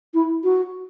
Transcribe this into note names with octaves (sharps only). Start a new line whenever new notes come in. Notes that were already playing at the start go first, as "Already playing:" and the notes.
E4
F#4